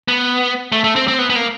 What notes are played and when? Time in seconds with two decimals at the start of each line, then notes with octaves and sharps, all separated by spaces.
0.08 B3
0.72 A3
0.84 A3
0.96 C4
1.08 C4
1.19 B3
1.30 B3
1.36 A#3